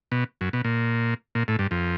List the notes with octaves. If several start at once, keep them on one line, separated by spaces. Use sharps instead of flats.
B2
F#2
B2
A#2
A#2
A2
G2
F2